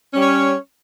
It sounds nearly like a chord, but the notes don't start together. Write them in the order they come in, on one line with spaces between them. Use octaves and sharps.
C#4 G3 C#5